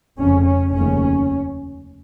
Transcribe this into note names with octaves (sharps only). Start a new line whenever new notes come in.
F1 F2 C#3 C#4
C#4
F1 D#2 C#3 C#4